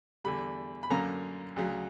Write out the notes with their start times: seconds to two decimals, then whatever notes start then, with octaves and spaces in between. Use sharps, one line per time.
0.24 E2 D3 G3 B5
0.83 B5
0.90 F#2 D3 A#3 C#4 A#5
1.56 D2 C#3 F#3